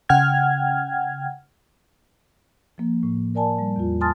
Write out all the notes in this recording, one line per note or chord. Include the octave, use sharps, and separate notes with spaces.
C#3 F#5 G5 F6 G#6
F3 A#3
A2
A#4 D5 G#5 A5
G3
E2 F4
G#5 A5 C6 D#6 F6 A6